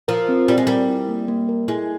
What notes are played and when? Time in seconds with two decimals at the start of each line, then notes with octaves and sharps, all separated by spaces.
0.08 F3 A#4
0.29 C4
0.48 G3 C4
0.58 G#3
0.67 G3 A#4
0.88 E4
1.09 A#3
1.28 A#3
1.49 A#4
1.68 G#3 E4